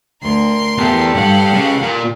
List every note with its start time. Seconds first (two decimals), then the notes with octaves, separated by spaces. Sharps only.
0.22 D2 A#4 C6
0.78 E2 G4 A4
1.14 B1 G2 F5 F#5
1.53 C#3 G#3
1.82 A#2